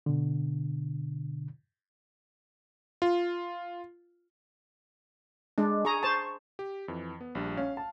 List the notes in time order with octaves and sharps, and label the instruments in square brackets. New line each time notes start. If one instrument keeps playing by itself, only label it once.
[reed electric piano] B2 D3
[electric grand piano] F4
[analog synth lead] G#3 [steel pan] D4
[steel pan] G#4 A#5 [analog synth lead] C#6
[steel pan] C5 A5
[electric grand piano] G4
F2 E3
B3
A#1 G3 D4
[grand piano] C#4 [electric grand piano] F5
[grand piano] A5